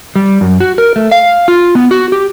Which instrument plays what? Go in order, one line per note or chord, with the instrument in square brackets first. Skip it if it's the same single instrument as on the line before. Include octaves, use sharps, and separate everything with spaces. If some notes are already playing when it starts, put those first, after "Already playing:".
[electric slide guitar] G3
F#2
F#4
A#4
A3
F5
F4
B3
F#4
G4